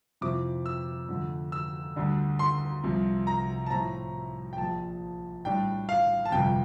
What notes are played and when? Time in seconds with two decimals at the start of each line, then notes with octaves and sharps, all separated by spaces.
0.21 F2 C3 F3 C4 E4 D6
0.66 E6
1.09 F2 D3 A3
1.52 E6
1.96 D2 D3 G3 D4
2.39 C6
2.84 C2 C3 F3
3.27 A#5
3.66 A5
3.70 A2 F3 C4 E4 A#5
4.53 G5
4.58 A#1 A#2 F3 A5
5.45 A2 G3 D4 G5
5.89 F5
6.25 A5
6.32 G1 F2 C3 G5